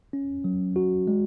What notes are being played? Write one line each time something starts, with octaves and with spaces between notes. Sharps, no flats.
C#4
F#3
F#4
G#3